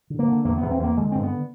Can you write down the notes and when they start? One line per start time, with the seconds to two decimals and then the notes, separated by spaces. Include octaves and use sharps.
0.10 D3
0.19 A#3
0.28 D3
0.45 E2 A#3
0.58 E2 B3
0.71 C4
0.79 E2 A#3
0.97 D3 G#3
1.12 G2 C4
1.23 B3